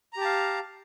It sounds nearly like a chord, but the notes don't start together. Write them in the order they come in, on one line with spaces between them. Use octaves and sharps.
A#5 G4 A5 F5